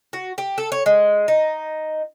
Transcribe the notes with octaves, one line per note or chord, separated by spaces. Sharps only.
F#4
G4
A4
C#5
G#3
D#4